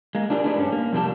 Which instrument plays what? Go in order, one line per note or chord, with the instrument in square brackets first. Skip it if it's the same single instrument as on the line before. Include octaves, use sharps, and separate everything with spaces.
[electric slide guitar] G#3 A#3
D4 D#4 G4 G#4 A#4 D5
A3 D4 D#4 G#4 B4
G2 G3 C#4
A#3
F2 C3 G3 A#3 G4 A5